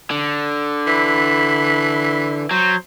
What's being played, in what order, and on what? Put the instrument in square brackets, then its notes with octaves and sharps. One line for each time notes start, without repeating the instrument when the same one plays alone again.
[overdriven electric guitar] D3
[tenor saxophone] E3 [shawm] B5
[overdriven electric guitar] F#3 [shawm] C5